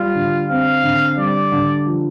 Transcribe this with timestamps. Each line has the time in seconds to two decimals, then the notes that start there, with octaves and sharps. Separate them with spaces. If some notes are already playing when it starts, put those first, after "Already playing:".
Already playing: G3 F4
0.15 D3
0.49 C4 F5
0.84 D3
1.17 G3 D5
1.52 D3
1.86 F3